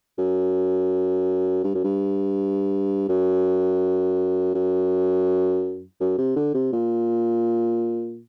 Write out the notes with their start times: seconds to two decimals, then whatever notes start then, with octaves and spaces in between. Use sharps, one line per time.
0.18 F#2
1.64 G2
1.75 F#2
1.84 G2
3.09 F#2
4.55 F#2
6.01 F#2
6.19 C3
6.36 D3
6.54 C3
6.72 A#2